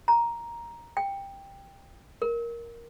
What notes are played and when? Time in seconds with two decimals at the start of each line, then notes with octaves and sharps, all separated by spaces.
0.08 A#5
0.97 G5
2.22 A#4